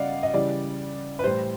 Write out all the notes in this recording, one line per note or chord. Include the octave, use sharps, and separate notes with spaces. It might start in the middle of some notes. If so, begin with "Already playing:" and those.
Already playing: C#3 G3 D5 D#5 F5 F#5
D#5
C#3 E3 G3 D5
B4
A2 E3 G3 C5